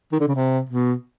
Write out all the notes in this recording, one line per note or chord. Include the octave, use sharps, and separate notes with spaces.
D#3
D3
C#3
C3
B2